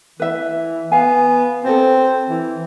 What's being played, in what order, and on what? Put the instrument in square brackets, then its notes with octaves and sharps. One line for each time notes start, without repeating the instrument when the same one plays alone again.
[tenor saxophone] E3 [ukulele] B4 E5
[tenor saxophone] B3 [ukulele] F5 G#5
[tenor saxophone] C4 [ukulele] F#4 A4
[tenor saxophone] E3